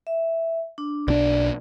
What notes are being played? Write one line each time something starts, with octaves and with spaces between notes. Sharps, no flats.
E5
D4
B1 D4 D5